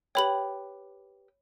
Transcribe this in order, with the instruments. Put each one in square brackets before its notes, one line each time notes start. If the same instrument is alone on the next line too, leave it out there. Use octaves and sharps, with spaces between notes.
[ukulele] G4 B4 G5 [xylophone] C#5 B5 F#7